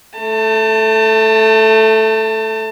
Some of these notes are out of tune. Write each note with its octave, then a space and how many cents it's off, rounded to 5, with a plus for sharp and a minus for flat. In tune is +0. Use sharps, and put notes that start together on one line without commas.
A3 +0 A5 +25